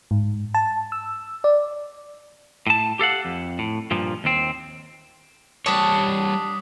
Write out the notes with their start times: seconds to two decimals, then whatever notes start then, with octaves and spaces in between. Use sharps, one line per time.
0.11 G#2
0.54 A5
0.92 E6
1.44 D5
2.67 A2 A5
2.99 G4 A4 F5 F#5
3.25 F2
3.59 A2
3.91 G2 A#2 F3
4.24 D#2 C4
5.66 G3 D4 C#5 A5 D6 D#6 B6